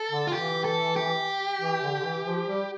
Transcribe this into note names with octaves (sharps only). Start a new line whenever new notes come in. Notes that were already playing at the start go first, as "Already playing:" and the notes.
Already playing: A4
D3
F4
E3 G4
A4
G4
E3
D3
D3
E3
F3
G3